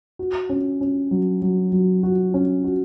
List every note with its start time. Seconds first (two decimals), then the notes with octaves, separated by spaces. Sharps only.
0.19 F#4
0.49 C#4
0.81 C#4
1.11 F#3
1.42 F#3
1.72 F#3
2.03 F#4
2.34 C#4
2.64 F#4